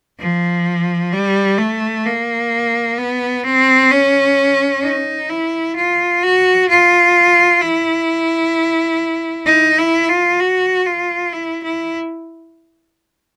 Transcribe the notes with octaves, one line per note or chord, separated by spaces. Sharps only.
F3
G3
A3
A#3
B3
C4
C#4
D#4
E4
F4
F#4
F4
E4
D#4
E4
F4
F#4
F4
E4
E4